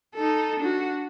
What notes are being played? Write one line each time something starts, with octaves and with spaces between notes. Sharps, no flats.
D#4 A4
D4 F#4